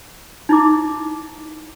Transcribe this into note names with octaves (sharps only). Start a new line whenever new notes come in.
D#4 E4 D6